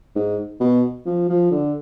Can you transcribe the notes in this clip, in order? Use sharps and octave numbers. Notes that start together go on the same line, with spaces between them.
G#2
B2
F3
F3
D3